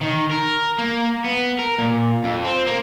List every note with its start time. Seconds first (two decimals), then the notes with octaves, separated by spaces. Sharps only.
0.02 D#3
0.32 A#4
0.79 A#3
1.25 B3
1.59 A#4
1.79 A#2
2.24 F2
2.45 C4
2.67 A#3